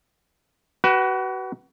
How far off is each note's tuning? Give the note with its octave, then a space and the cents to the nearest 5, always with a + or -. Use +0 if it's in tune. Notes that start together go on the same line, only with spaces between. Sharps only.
F#4 +30 B4 +0